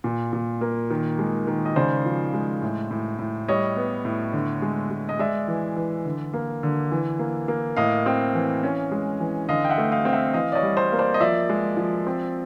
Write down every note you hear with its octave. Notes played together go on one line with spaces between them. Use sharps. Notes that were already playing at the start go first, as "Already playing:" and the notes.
A#2
A#2
A#3
D#3
G#3
D#3
D#5
C#3 C5 D5
F3
G#3
A2
A2
A2
G3 C#5 D#5
B3
A2
D3
G#3
G#3
D#5
G#3 D5 E5
E3
E3
D3
A#3
D3
E3
A#3
A#3
A2 D#5 F5
C4
E3
C#4
G#3
E3
D3 D#5 F5
G5
E5 F#5
A3
D#5 F5
C4 F5
E5 F#5
E3 D#5 F5
D5
C#5 D#5
G3
C5 D5
A#3
C5 D5
D#5
F3 D5 E5
G#3
F3
C4